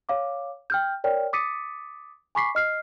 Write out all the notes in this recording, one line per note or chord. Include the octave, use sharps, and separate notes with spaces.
C#5 F5 D6
G5 F6 G6
A#4 C#5 D5 G5 F6
D6 D#6 A6 B6 C#7 D#7
G#5 B5 C#6 D6 B6 C7
D#5 F6 C7